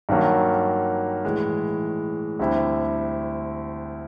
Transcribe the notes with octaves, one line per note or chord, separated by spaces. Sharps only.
G2 D#3 F#3 A#3
A2 E3 G#3
D2 D3 G3 C4 E4